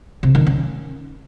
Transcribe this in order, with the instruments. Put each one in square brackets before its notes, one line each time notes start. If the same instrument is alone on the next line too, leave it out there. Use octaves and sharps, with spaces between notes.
[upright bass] C3
D#3
C#4